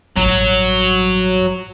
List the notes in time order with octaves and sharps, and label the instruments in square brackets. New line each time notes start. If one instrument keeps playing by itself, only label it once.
[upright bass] A1 G2 [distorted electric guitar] F#3